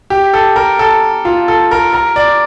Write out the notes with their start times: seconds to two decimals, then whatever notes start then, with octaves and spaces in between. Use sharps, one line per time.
0.10 G4
0.33 A4
0.56 A#4
0.79 A4
1.25 F4
1.48 A4
1.71 A#4
1.93 A#4
2.16 D5